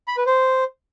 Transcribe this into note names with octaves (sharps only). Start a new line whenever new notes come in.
B5
B4
C5